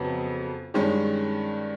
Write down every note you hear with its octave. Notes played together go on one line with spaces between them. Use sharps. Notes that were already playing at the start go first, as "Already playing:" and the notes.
Already playing: F2 C#3 F#3 B3
G2 D#3 G#3 C#4